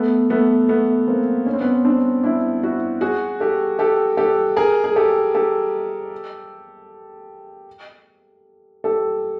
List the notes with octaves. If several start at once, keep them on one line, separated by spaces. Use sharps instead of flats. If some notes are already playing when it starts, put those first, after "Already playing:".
Already playing: A3 B3
A3 B3
A3 B3
A#3 C4
C#4
C4
B3 C#4
C4 D4
D4 E4
E4 F#4
F#4 G#4
G4 A4
G4 A4
G4 A4
G#4 A#4
G#4
G4 A4
G4 A4
G4 A4